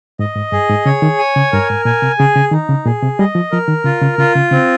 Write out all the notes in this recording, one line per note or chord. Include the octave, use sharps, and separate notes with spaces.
G#2 D#5
G#2
G2 G#4
G#2
C#3 C#5
D#3
G#5
C#3
G2 A#4
G#2
A#2 G#5
C3
C#3 G#4
C#3
D#3 D#4
C#3
A#2 G#4
C3
G3 D#5
F3
F3 A#4
D#3
C#3 F4
C#3
C#3 F4
C#3
C#3 C4